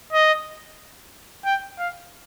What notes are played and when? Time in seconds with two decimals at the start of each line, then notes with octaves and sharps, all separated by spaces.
0.13 D#5
1.45 G5
1.79 F5